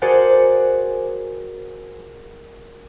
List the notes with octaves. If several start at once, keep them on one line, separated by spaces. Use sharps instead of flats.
F#4 G#4 A#4 C5 D5 F#5